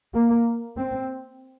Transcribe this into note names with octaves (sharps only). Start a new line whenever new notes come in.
A#3
C4